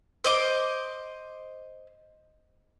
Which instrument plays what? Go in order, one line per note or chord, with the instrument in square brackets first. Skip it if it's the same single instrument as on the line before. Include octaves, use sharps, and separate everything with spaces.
[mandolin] C5 D#5 D6